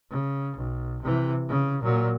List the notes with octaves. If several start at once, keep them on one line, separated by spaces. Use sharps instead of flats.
C#3
B1
C3 E3
C#3
A#2 F#3